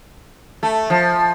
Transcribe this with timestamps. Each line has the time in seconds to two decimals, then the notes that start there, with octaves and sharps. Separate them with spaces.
0.63 A3
0.90 F3